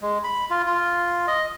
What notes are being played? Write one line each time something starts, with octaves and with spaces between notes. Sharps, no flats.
G#3
B5
F4
F4
D#5